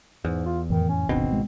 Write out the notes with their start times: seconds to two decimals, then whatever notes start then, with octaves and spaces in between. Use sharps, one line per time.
0.25 E2 G#2
0.46 F4
0.70 F2 A2 D#3 E3
0.89 C#4
1.09 D#1 G#1 B2 D#3 C4 D4
1.32 G#3